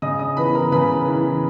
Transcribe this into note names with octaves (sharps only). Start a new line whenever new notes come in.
C#3 D#5 D#6
D#5 D#6
E3 B3 B4 B5
A#4 A#5
C#3 B4 B5
E3 B3